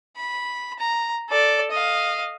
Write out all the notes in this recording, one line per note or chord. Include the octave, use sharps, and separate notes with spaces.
B5
A#5
A4 D5
D#5 F5